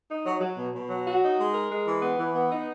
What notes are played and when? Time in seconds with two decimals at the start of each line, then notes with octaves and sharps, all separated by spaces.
0.09 D#4
0.26 F#3
0.41 F#3
0.57 B2
0.74 B2
0.90 F#3
1.06 F#4
1.22 D#4
1.38 G#3
1.54 A#4
1.70 G#3
1.87 E3
2.02 B3
2.19 E3
2.35 B3
2.51 D#4